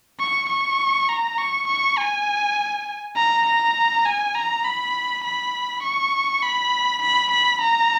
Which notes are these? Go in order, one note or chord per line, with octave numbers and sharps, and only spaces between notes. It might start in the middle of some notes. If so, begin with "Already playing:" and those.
C#6
C#6
A#5
C#6
C#6
G#5
A#5
A#5
G#5
A#5
B5
B5
C#6
B5
B5
B5
A#5